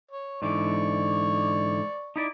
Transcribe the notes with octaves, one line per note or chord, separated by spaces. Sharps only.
C#5
G#2 D3 E3 D5 C#6
D#4 E4 D5